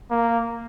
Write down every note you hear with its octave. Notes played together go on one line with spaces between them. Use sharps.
A#3